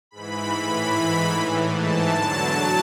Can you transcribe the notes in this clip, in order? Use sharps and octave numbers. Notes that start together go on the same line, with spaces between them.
G#2 E3 B5
A2 E3 B5
G#2 E3
A2 E3
G#2 E3 A5
E2 D3 F#3
A2 F#3 A5